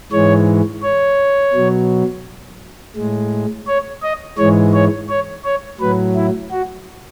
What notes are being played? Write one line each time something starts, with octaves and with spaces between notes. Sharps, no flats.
G#2 E3 G#3 C#5
C#5
B2 F#3
A2 G#3
C#5
D#5
G#2 E3 G#3 C#5
C#5
C#5
C#5
A2 F#3 B4
E4
F#4